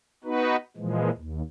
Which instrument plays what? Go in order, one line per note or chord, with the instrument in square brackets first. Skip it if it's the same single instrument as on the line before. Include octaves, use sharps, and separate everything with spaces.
[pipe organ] B3 D#4 F#4 B4
A#2 E3 F3 G#3
D#2